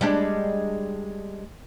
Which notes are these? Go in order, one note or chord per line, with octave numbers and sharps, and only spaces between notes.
G3 G#3 D4